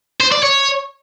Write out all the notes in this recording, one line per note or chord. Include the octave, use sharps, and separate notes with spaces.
C5
D5
C#5